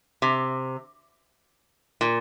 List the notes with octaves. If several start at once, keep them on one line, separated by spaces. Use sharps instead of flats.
C3
A#2